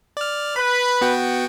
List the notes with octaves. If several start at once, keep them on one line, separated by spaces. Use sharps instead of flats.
D5 F6
B4 B5
B3 F#4 G5